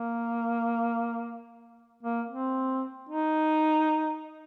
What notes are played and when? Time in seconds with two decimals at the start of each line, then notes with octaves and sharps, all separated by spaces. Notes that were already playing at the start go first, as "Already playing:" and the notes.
Already playing: A#3
2.03 A#3
2.29 C4
3.09 D#4